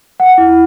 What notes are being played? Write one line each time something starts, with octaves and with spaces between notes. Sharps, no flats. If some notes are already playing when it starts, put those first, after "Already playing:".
F#5
E4